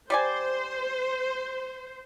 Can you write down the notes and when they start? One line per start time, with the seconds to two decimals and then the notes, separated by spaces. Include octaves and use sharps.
0.10 G3 C5 D5 G#5